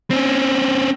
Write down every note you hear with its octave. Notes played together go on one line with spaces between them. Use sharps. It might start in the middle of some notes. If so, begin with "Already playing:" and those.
C4 C#4